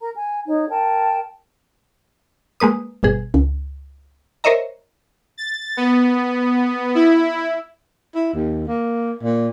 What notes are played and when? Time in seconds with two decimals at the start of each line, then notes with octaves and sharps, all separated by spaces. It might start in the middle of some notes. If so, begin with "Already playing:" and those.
0.01 A#4 A#5
0.16 G#5
0.47 D#4 C#5
0.70 A#4 G5 A5
2.60 G#3 A#3 B4 D#6
3.03 G1 B2 G#4
3.34 C#2
4.44 A#4 C5 C#5 D#5 E5 A#5
5.38 A6
5.77 B3
6.95 E4
8.15 E4
8.34 D#2
8.67 A#3
9.23 A#2